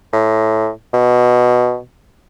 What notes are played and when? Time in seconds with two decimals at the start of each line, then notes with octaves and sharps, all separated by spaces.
0.13 A2
0.93 B2